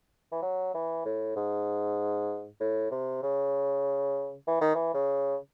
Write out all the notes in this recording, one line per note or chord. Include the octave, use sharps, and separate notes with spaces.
E3
F#3
E3
A2
G#2
A2
C3
C#3
E3
D#3
E3
C#3